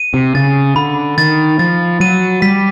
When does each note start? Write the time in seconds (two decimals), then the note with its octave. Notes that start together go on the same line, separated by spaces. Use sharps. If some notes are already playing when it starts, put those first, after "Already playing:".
Already playing: D#7
0.14 C3
0.35 C#3 A6
0.76 D3 B5
1.18 D#3 A6
1.59 F3 A6
2.00 F#3 D#7
2.42 G3 B6